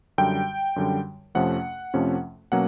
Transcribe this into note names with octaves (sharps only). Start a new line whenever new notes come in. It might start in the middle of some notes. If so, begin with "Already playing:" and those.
F#2 D3 G3 G5
F#2 D3 G3
F2 C3 F3 A3 C#4 F#5
F2 C3 F3 A3 C#4
B2 F#3 A#3 C#4 F#5